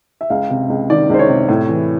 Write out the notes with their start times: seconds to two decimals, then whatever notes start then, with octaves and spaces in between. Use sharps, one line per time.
0.21 E5
0.30 C#2 F5
0.50 C3
0.69 C#2
0.90 D#3 D5
1.10 C#2 C5
1.19 C#5
1.29 C3
1.49 A2
1.69 E3